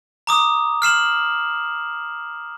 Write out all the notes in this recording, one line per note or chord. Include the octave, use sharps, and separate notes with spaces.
A#5 D6 D#6
F6 C7 E7 F#7